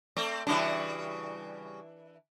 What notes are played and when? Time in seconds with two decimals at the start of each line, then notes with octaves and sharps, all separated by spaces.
0.17 A3 C4 D5
0.47 C#3 E3 G3 D4 F#4